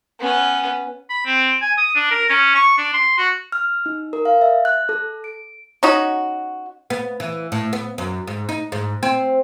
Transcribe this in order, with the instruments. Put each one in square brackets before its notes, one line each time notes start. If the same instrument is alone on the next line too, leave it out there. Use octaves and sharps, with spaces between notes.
[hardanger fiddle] B3 C#4
[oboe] B5
C4
G#5
D#6
D4
A#4
C#4
C#6
D4
C6
F#4
[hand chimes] F6
D#4
A#4
F5
E5
F#6
A4
D7
[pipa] C#4 D#4 F#4
[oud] B3
E3
A2
B3
F#2
G#2
D#4
G#2
C4